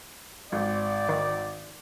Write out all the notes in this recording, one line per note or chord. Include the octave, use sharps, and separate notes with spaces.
G#1 D5
D#3